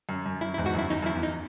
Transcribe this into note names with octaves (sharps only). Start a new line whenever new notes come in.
F#2
F#2
F#2 E4
E4
E2 G#2
F#4
F#2 E4
E2 D#4
F#2 E4
E2
D#4